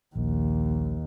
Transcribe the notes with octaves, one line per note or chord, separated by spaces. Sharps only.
A#1 D#2